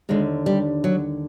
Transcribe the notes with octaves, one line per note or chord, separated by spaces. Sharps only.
D#2 D3 G#3
G3
F#3